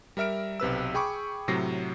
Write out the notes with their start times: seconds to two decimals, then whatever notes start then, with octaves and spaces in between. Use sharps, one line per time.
0.17 G3 A#4 E5 F6 D7
0.60 B1 C3 B4 E6
0.94 G#4 G5 B5 C#6 D6
1.48 A2 C3 F#3 A#6 C7